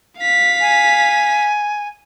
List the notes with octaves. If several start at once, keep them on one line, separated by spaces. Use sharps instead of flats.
F5 B6
G#5